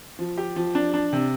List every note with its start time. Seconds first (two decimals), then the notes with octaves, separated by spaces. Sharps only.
0.19 F3
0.38 G4
0.56 F3
0.75 D4
0.94 D4
1.13 C3